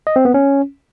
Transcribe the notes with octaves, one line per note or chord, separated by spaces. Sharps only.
D#5
C4
B3
C#4